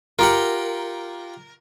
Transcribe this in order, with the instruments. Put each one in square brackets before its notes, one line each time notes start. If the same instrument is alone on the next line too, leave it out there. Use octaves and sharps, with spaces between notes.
[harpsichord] F4 G4 F#5 [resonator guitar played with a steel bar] A#4